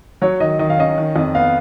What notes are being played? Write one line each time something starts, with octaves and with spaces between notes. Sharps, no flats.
F#3 C#5
D#3 D#5
D#3 D#5
F5
C#4 D#5
D#3
F2
B3 F5